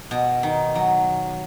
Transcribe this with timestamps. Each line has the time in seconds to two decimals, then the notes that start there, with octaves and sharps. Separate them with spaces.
0.11 B2
0.43 D#3
0.75 F#3